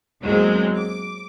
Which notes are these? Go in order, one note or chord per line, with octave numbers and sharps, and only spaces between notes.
E2 F#3 G#3 A#3 C4
D6